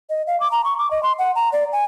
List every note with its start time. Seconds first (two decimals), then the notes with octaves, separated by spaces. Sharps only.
0.10 D#5
0.27 F5
0.40 D6
0.51 A#5
0.64 C#6
0.78 D6
0.91 D#5
1.03 C6
1.18 F#5
1.35 A#5
1.52 D5
1.72 G#5